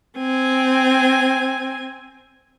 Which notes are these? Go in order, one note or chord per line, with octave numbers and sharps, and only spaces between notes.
C4 G#5